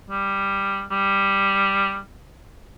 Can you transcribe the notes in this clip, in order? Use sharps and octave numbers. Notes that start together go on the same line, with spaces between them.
G3
G3